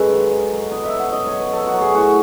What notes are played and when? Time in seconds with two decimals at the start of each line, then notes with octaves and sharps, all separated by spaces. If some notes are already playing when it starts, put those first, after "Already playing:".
Already playing: F#2 G#3 A4 B4
0.10 D#3
0.31 D#3
0.52 F#3
0.71 B2 D#5
0.85 E5
0.91 F#3
0.99 F#5
1.12 F#3 D#5
1.27 C#5
1.32 F#3
1.39 B4
1.53 F#3 A4
1.67 F#4
1.73 F#3
1.81 G#4
1.95 A2 F#4